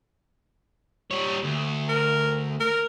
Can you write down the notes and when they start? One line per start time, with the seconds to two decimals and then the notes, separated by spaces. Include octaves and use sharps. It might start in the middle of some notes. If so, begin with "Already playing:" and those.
1.11 G3 C#5
1.44 D2
1.89 A#4
2.60 A#4